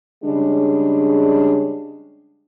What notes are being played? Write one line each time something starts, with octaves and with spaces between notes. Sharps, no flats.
C#3 G3 G#3 D4